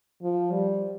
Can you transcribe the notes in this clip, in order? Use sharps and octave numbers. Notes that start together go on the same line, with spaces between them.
F3
G3